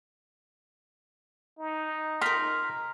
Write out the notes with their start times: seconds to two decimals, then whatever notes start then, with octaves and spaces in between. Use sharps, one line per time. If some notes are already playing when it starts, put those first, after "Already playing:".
1.59 D#4
2.21 A#4 A#5 C6 F6 B6